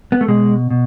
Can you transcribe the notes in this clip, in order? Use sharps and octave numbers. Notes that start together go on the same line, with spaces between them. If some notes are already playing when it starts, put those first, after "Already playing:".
B3
A3
B2 G#3
B2